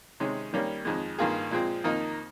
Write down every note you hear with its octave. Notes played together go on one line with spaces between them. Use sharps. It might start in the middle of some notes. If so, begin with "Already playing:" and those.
C3 D#3 G#3 C#4
D#3 G3 A#3 C#4
F2 D#3 G#3
G2 D#3 A#3 F4 G#4
A#2 F3 G#3 C4
F2 D#3 A#3 D#4